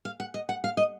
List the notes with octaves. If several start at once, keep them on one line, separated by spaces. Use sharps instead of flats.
F5
F#5
D#5
F#5
F5
D#5